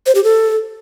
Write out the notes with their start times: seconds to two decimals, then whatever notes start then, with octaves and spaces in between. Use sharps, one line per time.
0.06 C5
0.15 G4
0.24 A4